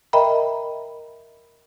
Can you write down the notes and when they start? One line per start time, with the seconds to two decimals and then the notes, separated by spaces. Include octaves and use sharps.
0.13 A#4 D#5 E5 G5 A#5 B5